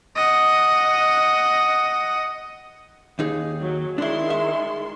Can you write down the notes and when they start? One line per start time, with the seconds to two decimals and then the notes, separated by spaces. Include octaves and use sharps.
0.16 D#5 F#5
3.19 D#2 D#4 G#4
3.60 F#3
3.98 D#3 G#3 D4 E4 C6
4.30 E5